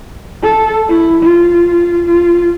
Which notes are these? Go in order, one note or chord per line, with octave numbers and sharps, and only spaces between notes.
A4
E4
F4
F4